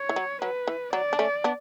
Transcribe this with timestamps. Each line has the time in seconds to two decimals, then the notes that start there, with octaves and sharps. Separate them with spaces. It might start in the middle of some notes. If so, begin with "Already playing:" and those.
Already playing: C#5
0.09 E3
0.16 F#3
0.42 F#3 B4
0.67 E3
0.93 F#3 D5
1.13 D4
1.19 A3 C#4
1.44 B3 D4